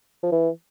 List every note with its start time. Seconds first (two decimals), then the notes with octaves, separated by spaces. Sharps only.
0.23 F3
0.32 E3